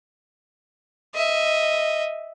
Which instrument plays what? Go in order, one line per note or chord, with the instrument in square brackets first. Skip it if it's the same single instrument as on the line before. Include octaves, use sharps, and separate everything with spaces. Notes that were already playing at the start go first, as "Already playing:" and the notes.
[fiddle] D#5 E5